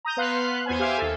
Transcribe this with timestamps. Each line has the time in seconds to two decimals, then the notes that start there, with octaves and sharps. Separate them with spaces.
0.05 A#5 D#6 G6
0.17 B3 B4 F5 C6 F#6
0.66 E2 B3 C5 G#5
0.79 G4 C5 E5 F5 G#5
0.98 D#2 A4